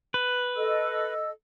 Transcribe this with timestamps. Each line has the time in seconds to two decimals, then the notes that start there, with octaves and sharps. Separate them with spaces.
0.14 B4
0.56 A4 D#5 E6